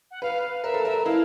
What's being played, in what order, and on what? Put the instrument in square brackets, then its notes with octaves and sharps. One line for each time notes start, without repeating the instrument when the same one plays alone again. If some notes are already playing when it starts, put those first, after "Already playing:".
[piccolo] F#5
[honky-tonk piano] B4 [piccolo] F5
[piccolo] F5
[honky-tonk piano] A#4 [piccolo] E5
[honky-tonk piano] A4
[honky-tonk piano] A#4 [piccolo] E5
[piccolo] E5
[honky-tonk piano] E4 [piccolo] F5